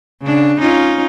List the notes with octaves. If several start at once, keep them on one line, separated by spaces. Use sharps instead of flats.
C#3 D4
C#4 D#4 F4